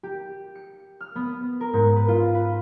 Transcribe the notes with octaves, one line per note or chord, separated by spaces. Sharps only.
G4
C#7
F6
B3
A#4
G#2
B4
F4
B4